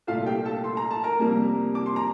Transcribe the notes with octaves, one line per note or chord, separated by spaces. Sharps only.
C2 A#2 A3 F4 F5
G4 G5
A4 A5
C6
A#5
A5
A#4 A#5
F2 C3 G3 A#3
D6
C6
A#5